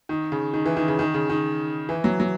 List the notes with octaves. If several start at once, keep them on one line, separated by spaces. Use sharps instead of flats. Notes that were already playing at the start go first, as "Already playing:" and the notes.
D#3
C#3
D#3
E3
D#3
C#3
D#3
C#3
D#3
E3
F#3
F#3